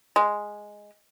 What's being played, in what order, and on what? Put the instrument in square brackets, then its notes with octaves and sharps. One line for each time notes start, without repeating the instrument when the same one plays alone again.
[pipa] G#3